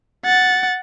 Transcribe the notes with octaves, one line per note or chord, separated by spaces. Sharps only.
F#5 A6